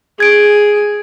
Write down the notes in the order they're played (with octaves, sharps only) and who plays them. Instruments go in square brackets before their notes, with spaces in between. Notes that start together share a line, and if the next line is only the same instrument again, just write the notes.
[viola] G#4 [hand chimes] G#6 D7